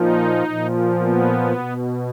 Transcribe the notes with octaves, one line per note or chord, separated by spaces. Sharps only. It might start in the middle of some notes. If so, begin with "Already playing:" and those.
Already playing: A#2 F3 D#4
A#2 F3
B3
B2